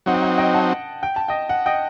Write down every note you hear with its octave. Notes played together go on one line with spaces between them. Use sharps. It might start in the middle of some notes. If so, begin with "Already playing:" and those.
F#3 C4 D#4 F#5
G5
F#5
D#5 G5
F#5 A5
G5
A5
D#5 G5
F#5
D#5 G5